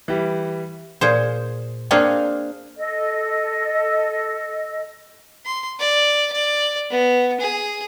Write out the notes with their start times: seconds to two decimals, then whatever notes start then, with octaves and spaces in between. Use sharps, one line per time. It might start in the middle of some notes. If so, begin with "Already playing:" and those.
0.08 E3 G3
1.01 A#2 G#4 C5
1.91 A#3 C4 D4 F4 G#4
2.77 A4 D#5
5.46 C6
5.79 D5
6.32 D5
6.90 B3
7.40 G#4